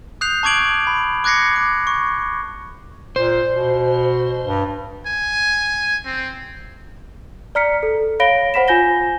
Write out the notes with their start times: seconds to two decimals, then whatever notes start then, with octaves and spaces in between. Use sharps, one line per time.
0.21 D#6 F#6 G6 C7 F7
0.43 A5 C#6 D6 G#6 D7 F#7
0.87 B5
1.24 D6 F#6 G#6 A#6 C7 C#7
1.56 D6
1.87 C#6
3.16 A#2 C5
3.53 B2
4.46 G2
5.07 G#5
6.06 C4
7.55 D5 A#5 F6 B6 C#7
7.83 A4
8.20 C#5 F5 B5 A#6 D7 G7
8.54 C5 F#5 B5 B6 E7
8.68 F4 G#5 G6 A#6 G7